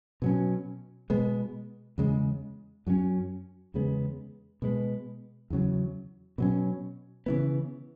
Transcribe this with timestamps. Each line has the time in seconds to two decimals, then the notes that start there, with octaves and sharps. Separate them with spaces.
0.22 B2 F#3 C#4
1.10 B2 G#3 B3
1.98 E2 C#3 G#3
2.87 F#2 F#3 C#4
3.74 E2 C#3 G#3 B3
4.62 B2 G#3 B3
5.50 E2 C#3 F#3
6.38 B2 F#3 C#4
7.26 C#3 E3 B3